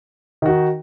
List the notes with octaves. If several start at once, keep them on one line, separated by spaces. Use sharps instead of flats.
D#3 D#4 F#4